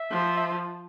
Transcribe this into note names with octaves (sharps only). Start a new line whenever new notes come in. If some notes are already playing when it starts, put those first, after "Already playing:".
Already playing: E5
F3
E5